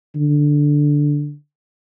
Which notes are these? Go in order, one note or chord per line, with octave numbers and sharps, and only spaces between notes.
D3